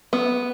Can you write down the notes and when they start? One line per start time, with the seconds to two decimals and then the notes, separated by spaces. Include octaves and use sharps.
0.13 B3